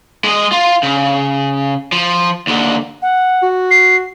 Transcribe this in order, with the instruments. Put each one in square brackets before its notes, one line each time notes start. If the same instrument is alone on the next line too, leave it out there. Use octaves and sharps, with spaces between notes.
[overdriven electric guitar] G#3 D#5
F4
C#3
F3
D#2 D3
[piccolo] F#5
[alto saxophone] F#4
[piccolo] C7